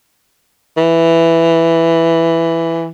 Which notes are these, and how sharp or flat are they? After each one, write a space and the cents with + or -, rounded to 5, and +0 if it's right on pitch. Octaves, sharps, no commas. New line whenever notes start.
E3 +5